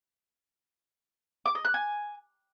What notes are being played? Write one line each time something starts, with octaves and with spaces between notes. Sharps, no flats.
D6
D#5
F#6
G#5